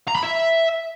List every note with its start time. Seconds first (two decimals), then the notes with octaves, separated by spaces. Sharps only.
0.08 A#5
0.15 B5
0.23 E5